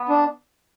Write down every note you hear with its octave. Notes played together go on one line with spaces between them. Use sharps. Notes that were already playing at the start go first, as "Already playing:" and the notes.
Already playing: B3
D4